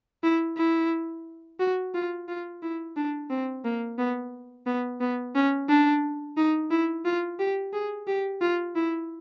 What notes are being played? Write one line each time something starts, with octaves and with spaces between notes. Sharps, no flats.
E4
E4
F#4
F4
F4
E4
D4
C4
A#3
B3
B3
B3
C#4
D4
D#4
E4
F4
G4
G#4
G4
F4
E4